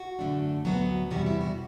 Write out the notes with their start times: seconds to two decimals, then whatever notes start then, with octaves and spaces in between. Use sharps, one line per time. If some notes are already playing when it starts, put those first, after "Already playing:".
Already playing: F#4
0.19 F#2 D3 A3 D4
0.65 D2 C3 F#3 B3 F#4
1.10 E2 C3 G3 B3 F#4
1.26 E4
1.41 F#4